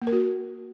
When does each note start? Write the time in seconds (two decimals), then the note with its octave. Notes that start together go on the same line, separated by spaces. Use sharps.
0.02 A#3
0.07 A#4
0.12 F#4